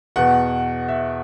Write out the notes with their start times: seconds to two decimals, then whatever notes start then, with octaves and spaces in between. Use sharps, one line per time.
0.16 E2 B2 F#5
0.88 E5